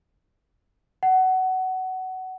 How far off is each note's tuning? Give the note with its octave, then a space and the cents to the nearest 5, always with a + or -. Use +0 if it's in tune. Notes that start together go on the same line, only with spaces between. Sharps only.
F#5 +20